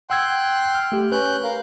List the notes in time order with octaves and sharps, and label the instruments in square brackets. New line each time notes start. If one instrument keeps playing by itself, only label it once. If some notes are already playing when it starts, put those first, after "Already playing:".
[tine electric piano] F#5 E6 G#6 [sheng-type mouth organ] G5 C6 F#6
[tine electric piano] F6
A3 G4
[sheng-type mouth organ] C#4 F#6 G6 [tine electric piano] B4
[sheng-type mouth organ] A#4 F5